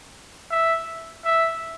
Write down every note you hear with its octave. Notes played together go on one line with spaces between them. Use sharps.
E5
E5